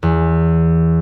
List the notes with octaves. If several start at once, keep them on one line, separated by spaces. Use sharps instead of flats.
E2